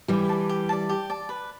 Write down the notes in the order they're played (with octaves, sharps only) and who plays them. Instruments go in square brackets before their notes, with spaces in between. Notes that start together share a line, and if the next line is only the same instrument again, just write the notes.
[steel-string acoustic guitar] E3 G3 [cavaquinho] G4
[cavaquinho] D5 A5
G4
D5 A5
G4
D5 A5
B4